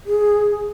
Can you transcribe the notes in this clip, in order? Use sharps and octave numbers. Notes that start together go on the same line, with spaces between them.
G#4